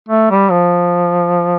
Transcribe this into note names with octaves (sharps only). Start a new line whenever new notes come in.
A3
G3
F3